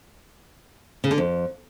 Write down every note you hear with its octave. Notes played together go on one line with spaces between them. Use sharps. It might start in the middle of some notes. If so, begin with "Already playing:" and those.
C#3
D3
F2